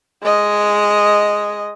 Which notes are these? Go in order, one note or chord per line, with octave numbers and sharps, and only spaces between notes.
G#3 D#5